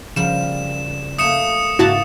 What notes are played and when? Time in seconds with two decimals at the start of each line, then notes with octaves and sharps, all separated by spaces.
0.16 C#3 F3 G3 A#4 E7
1.18 A3 A#3 D#6 C#7 E7
1.79 G#2 C#3 A#3 E4 F#4 A5